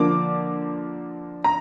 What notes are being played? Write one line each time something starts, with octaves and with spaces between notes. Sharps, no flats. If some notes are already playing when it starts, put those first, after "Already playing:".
Already playing: D3 F3 A#3 D4 D6
A#5